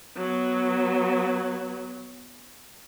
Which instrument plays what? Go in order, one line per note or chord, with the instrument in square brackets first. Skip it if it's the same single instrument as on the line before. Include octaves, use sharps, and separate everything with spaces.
[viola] F#3 B3